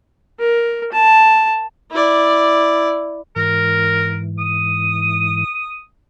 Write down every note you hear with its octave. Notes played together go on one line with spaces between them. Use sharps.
A#4
A5
E4 D5
G#2 E3 A#4
D#6